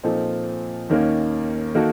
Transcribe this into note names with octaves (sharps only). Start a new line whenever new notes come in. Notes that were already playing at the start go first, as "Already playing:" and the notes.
A#2 F3 C4 D#4 A4
D#2 D#3 A#3 C#4
D#3 A#3 D#4 F#4 A4